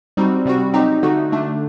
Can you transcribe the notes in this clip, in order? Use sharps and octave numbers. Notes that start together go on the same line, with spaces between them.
G3 C4 D#4 F#4
C3 G3 C4 F#4
F#3 C4 D#4 G4
D3 A3 D#4 F#4
D3 A3 D4